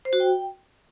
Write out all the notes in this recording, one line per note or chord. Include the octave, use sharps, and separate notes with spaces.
C5
F#4
G5